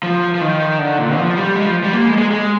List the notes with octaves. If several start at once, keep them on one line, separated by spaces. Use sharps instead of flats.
F3
F3
D#3
D3
A#2
F3
G3
G#3
F3
G3
A#3
G#3
G#3
G#3